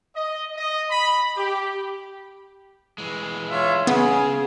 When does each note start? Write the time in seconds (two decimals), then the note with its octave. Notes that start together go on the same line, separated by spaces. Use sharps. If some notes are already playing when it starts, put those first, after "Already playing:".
0.15 D#5
0.57 D#5
0.88 B5
1.36 G4
2.98 E3 G#3
3.50 F4 C#5 E5
3.87 C#3 B3 G#4